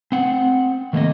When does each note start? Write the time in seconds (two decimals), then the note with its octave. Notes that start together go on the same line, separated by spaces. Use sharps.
0.12 C4 F#5
0.93 D#3 A3 A#3 D5 D#5